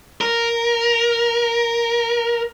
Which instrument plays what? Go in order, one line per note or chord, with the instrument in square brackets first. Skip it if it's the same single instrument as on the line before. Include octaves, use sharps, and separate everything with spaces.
[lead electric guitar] A#4